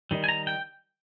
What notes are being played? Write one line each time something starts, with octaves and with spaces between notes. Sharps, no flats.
D#3 G3
G#5
A#5
G5